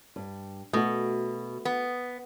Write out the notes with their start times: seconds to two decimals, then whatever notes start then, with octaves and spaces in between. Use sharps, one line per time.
0.16 G2
0.73 B2 A3 F#4
1.65 B3